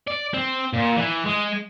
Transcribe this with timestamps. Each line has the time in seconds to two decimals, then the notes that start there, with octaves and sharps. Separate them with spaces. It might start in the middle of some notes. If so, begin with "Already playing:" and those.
0.08 D5
0.34 C4
0.73 A#2
0.96 E3
1.26 G#3